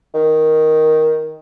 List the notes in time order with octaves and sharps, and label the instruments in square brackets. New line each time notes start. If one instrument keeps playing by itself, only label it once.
[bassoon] D#3